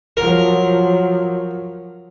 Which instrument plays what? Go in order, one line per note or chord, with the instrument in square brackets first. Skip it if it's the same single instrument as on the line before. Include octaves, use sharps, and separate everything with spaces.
[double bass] F3 F#3 [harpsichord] A#4